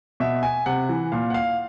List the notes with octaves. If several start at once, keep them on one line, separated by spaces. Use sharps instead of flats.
B2 E5
G#5
C3 F#5
E3
A#2 F5
F#5
F5